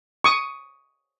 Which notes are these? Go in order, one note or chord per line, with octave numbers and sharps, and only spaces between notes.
C#6 D#6